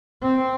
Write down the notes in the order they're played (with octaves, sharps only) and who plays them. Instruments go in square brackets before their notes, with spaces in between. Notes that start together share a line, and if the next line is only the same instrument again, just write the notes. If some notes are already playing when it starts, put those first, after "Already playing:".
[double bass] C4